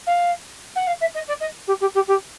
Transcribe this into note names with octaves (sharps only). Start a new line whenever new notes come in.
F5
F#5
F5
E5
D#5
D5
D#5
G4
G4
G4
G4